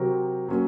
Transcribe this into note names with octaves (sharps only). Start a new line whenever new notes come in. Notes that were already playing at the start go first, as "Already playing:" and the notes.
Already playing: C3 F#3 C4 F#4 A#4
F#3 A#3 C#4